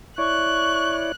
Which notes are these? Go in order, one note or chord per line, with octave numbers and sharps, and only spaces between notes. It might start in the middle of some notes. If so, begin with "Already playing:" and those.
E4 C#5 D5 C#6 F#6